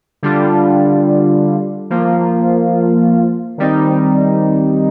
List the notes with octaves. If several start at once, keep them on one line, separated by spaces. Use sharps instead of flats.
D3 G3 D4 F4
F3 A#3 F4
D#3 G3 C4 D#4